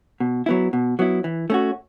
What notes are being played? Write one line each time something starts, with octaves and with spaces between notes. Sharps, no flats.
B2
F#3 B3 E4
B2
F#3 B3 E4
E3
A3 C#4 F#4